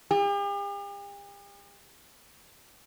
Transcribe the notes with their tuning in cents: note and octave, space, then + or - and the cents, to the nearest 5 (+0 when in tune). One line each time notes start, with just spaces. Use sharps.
G4 +45